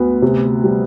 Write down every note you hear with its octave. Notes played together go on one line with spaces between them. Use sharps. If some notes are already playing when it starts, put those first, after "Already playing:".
Already playing: D2 B3
C3
G3